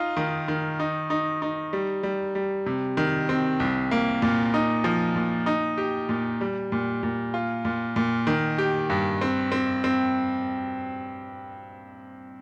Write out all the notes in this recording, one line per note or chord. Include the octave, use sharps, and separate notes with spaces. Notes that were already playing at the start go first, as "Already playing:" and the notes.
Already playing: D#4 F4
D#3
D#3
D#4
D#4
D#4
G3
G3
G3
C3
D#3
C4
C2
A#3
A#2
D#4
F3
A#2
D#4
G4
A#2
G3
A#2
A#2
F4
A#2
A#2
D#3
G4
G2
C4
C4
C4